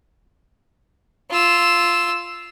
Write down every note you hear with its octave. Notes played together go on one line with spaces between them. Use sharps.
F4 E6